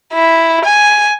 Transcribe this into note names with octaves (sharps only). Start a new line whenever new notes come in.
E4
G#5